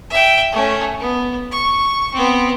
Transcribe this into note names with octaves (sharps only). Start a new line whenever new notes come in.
E5 G5
A3 C#4
B3
C#6
B3 C4